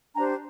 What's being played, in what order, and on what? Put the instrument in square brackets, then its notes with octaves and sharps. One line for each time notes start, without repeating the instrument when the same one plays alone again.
[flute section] D4 G4 C5 G#5 A#5